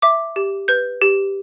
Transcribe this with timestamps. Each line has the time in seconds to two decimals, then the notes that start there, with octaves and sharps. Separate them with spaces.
0.02 E5 D6
0.36 G4
0.68 B4 G6
1.02 G4